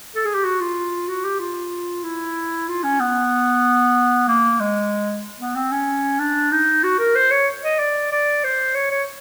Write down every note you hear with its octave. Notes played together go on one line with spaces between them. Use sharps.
A4
G#4
G4
F#4
F4
F#4
G4
F4
E4
F4
C#4
B3
A#3
G#3
B3
C4
C#4
D4
D#4
F#4
A#4
C5
C#5
D#5
D5
D5
C5
C#5
C#5